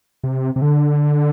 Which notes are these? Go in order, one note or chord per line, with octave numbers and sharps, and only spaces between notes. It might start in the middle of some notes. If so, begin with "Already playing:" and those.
C3
C3
D3